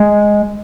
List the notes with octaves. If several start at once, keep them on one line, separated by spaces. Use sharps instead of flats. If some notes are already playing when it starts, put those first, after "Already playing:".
Already playing: G#3